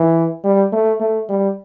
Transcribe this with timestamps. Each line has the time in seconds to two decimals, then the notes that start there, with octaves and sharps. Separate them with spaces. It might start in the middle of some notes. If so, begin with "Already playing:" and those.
Already playing: E3
0.44 G3
0.72 A3
1.00 A3
1.29 G3